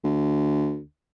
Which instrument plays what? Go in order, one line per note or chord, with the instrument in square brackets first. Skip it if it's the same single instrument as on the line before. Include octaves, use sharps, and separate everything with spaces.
[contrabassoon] D2